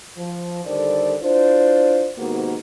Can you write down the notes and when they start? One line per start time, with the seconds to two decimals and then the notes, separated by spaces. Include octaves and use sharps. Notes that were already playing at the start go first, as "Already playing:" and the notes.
0.16 F3
0.65 D3 D#3 G3 A4 C5 D5
1.21 D4 E4 F4 C5
2.18 G#2 C3 D#3 A#3 B3 F#4